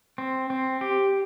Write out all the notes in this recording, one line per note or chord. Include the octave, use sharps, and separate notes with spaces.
C4
C4
G4